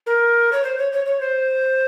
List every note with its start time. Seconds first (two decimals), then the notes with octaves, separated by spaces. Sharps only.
0.06 A#4
0.52 C#5
0.64 C5
0.78 C#5
0.92 C#5
1.05 C#5
1.20 C5